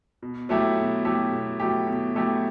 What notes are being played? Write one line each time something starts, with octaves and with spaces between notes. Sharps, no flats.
B2
F#3 A3 E4 G4
B2
F#3 A3 E4 G4
B2
F#3 A3 E4 G4
B2
F#3 A3 E4 G4